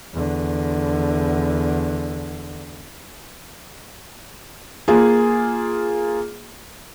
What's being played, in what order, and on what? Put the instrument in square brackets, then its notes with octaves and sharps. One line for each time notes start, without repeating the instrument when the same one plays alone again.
[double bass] E2 D3
[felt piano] A#3 F4 G#4